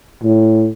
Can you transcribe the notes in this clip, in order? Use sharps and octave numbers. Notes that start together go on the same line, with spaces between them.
A2